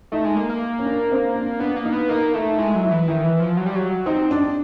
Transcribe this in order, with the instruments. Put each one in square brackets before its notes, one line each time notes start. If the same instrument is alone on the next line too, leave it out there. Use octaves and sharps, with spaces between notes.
[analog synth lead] A3 [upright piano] D#4
[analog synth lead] G#3
A#3
A#3
[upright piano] C#4
D4
C4
D4
[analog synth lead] B3 [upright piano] D4
[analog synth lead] A#3
[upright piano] D#4
[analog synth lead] B3
[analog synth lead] A#3 [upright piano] D#4
[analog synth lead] A3 [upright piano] D#4
[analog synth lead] G#3 [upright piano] E4
[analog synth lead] F#3
[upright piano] E4
[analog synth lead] E3
[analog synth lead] D#3 [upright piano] E4
[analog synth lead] E3
F3
F#3
G3
F#3
[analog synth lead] C4 [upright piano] D#4
[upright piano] D4